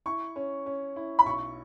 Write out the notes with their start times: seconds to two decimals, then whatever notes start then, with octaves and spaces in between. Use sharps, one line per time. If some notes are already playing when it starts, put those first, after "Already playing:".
0.06 E4 C#6
0.36 C#4
0.66 C#4
0.96 E4
1.19 B5
1.25 B1 C#6